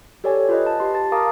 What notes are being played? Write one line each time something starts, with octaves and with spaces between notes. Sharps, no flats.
G4 A4 C#5 D5 G#5
F4 B4 D#5
A5
G4 C6
A5 A6
A#4 F5 A5 A#5 D6 D#6